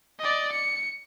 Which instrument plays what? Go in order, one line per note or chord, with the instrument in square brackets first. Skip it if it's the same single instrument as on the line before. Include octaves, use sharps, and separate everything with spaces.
[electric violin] D5 D#5
C#7